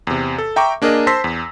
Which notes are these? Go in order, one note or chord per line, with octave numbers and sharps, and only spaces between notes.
E2 C3
A4
E5 G5 A#5 C#6 D6
A#3 D4 G#4 A#4 D#5
C5 A5 C6 E6 A#6 B6
E2